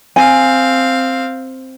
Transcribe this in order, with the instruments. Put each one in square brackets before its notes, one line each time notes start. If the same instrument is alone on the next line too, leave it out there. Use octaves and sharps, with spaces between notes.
[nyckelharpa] C4 F5 [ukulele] G#5